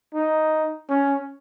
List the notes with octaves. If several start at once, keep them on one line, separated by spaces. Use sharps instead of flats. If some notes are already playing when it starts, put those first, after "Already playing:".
D#4
C#4